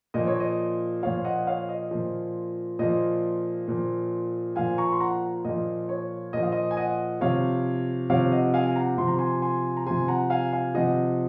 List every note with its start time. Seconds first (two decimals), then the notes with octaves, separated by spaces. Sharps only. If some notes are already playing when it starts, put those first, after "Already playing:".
0.14 A#2 F3 D#5
0.27 C#5
0.40 D#5
1.03 A#2 F3 C#5 F5
1.25 D#5 F#5
1.47 C#5 F5
1.69 D#5
1.91 A#2 F3
2.79 A#2 F3 D#5
3.68 A#2 F3
4.56 A#2 F3 F5 G#5
4.78 A#5 C#6
4.92 C6
5.00 F#5 A#5
5.45 A#2 F3 D#5
5.89 C#5
6.33 A#2 F3 D#5
6.43 F5
6.52 D#5
6.71 G#5
6.77 D#5 F#5
7.21 C3 F3 C#5 F5
8.10 C3 F3 C#5 F5
8.32 D#5 F#5
8.54 F5 G#5
8.66 G#5
8.76 F#5 A#5
8.98 C3 F3 C6
9.08 A#5
9.19 G#5 C6
9.42 G#5 C6
9.77 A#5
9.86 C3 F3 G#5 C6
10.08 F#5 A#5
10.30 F5 G#5
10.53 F5 G#5
10.74 C3 F3 D#5 F#5